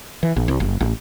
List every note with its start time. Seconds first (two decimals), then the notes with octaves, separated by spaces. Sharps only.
0.23 E3
0.37 A#1
0.48 C2
0.60 F#1
0.81 A1